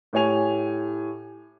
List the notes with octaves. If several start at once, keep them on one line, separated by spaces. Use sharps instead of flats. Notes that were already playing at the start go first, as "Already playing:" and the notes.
A2 G4 C#5 G#5 F7